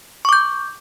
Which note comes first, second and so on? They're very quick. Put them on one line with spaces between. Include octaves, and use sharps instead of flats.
C#6 D6 G6